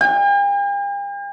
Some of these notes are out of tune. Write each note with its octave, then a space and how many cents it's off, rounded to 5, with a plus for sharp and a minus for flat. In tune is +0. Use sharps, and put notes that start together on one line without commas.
G5 +45